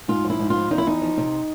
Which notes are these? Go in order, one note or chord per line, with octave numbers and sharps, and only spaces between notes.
G#2 F4
F3
E4
G#2
F4
F3
E2 D#4
E4
E2 D#4
F3
C3